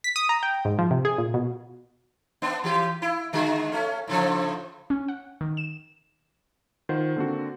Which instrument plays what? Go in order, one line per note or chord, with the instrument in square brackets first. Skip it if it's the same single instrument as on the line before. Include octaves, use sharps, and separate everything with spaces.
[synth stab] B6
D#6
A#5
G5
G#2
F3
C3
G#4
A#2
B2
[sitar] B3 D4
E3 G4
E4
D3 G#3 F#4
A3 C#4
A2 C#3 F3
[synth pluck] C#4
F#5
D#3
E7
[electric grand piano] D#3 F4 C5 F#5
D3 A#3 C4 D4 F#4